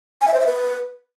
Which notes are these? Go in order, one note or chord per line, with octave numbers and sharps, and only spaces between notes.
G#5
E5
C5
E5
B4